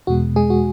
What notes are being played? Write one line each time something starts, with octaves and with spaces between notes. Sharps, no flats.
E2 B2 G#3 F#4
G#3 G#4
F#4